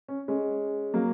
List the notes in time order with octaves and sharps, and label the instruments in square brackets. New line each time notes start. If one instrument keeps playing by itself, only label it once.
[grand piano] C#4
G#3 C#4
F#3 A#3